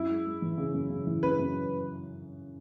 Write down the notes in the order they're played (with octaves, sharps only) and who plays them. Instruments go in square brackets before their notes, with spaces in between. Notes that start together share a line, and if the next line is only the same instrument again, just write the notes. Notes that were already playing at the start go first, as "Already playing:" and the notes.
Already playing: [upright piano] F#2 [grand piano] E4
[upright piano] G#3
G#3
E3
C#3
F#2
C#3
E3
[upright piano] C#3 [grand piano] B4
[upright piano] F#2